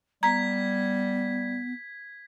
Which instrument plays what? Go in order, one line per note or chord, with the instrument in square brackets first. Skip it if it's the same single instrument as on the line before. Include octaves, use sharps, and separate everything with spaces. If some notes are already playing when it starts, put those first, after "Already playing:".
[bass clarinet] G3 [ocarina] B3 [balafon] A#5 [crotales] G#6 B6